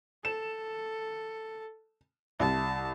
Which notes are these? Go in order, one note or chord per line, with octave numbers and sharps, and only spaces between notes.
A4 E7
C2 A5